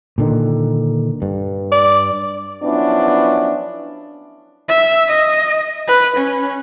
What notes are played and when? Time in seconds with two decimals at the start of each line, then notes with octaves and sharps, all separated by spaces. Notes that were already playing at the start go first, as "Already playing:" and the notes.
0.18 A#2 D3 D#3
1.22 G2
1.72 D5
2.63 F3 F#3 B3 C#4 D4 E4
4.69 E5
5.09 D#5
5.88 B4
6.16 C#4